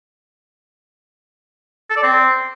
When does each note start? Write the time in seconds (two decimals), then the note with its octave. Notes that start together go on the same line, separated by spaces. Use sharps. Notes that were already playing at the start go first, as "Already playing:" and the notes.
1.90 A4
1.97 D5
2.03 C4